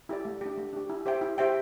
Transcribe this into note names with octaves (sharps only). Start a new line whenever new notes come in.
E4 G4 D5
A3
D4 G4
A3
D4 G4
E4
G4 C5 E5 G5
E4
G4 C5 E5 G5